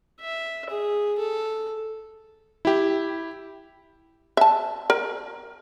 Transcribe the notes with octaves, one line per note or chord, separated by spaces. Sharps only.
E5
G#4
A4
E4 G4
E5 A5
A#4